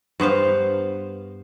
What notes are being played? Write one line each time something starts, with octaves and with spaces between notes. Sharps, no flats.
G2 B3 C5 F5